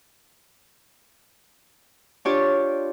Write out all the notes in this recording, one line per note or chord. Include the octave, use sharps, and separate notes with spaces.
D4 F4 G4 C#5 D5